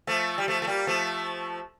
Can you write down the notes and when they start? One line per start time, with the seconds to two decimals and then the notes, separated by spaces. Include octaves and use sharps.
0.07 F3 A3
0.38 G3
0.48 F3 A3
0.62 A3
0.67 G3 A#3
0.87 F3 A3